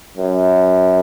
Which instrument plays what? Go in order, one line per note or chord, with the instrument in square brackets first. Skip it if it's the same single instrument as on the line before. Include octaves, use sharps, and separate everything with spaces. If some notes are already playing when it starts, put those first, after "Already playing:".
[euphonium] F#2